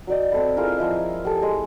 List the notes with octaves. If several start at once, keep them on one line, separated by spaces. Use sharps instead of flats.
F#3 D5 D#5
C4 A4 B5
E4 F4 G#4 A#4
F3 E4 D#5 E5
G4 A4
G#3